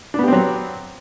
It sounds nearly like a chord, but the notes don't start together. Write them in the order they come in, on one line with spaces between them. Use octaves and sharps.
D4 B3 G4 C4 F#3